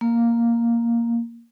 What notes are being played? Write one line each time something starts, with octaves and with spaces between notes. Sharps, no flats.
A#3